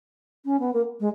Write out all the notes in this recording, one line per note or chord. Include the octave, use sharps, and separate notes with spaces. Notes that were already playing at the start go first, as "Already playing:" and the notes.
C#4
B3
A#3
G#3